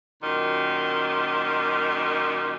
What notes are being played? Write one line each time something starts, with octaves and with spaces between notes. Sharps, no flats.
F#2 A#2 D#3